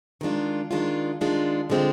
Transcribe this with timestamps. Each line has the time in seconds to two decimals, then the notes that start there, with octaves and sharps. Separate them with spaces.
0.21 D#3 G#3 D4 F4
0.71 D#3 G#3 D4 F4
1.21 D#3 G#3 D4 F4
1.70 D3 G#3 C4 F4